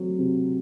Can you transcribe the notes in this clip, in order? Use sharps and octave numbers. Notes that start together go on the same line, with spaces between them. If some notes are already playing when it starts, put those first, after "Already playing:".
Already playing: F#3 A3 C4
C3